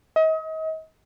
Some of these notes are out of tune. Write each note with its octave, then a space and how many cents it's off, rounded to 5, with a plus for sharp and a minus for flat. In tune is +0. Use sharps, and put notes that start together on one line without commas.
D#5 +35